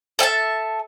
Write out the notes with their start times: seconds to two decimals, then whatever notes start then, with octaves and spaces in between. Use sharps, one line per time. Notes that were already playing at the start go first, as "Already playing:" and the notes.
0.19 A4 E5 G#5 A5